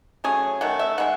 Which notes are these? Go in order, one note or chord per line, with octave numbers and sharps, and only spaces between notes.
F#3 A3 C#4 G#4
D#3 A3 F#5
E5
G#3 D#4 F#5